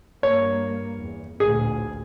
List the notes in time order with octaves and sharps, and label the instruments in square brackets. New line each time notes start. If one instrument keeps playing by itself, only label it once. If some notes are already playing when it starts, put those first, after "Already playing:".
[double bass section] G2 A#3 [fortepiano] C#5
[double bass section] E2
[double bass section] A1 D2 A#2 [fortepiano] G#4